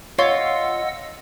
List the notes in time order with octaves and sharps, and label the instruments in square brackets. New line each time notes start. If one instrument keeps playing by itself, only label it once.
[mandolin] F4 [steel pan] C#5 [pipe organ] D#5 F#5 E6